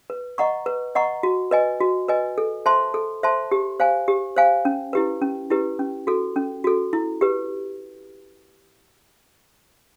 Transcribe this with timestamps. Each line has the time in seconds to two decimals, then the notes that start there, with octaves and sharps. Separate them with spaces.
0.10 B4
0.38 D#5 F#5 A#5 C#6
0.66 B4
0.95 D#5 F#5 A#5 C#6
1.23 F#4
1.51 B4 D#5 G#5
1.81 F#4
2.08 B4 D#5 G#5
2.38 A4
2.66 C5 E5 A5 C6
2.94 A4
3.23 C5 E5 A5 C6
3.51 G4
3.80 C5 F5 G#5
4.08 G4
4.36 C5 F5 G#5
4.65 C#4
4.93 E4 G4 B4
5.22 C#4
5.50 E4 G4 B4
5.79 C#4
6.07 F#4 A4
6.36 C#4
6.64 F#4 A4
6.93 E4
7.21 G4 B4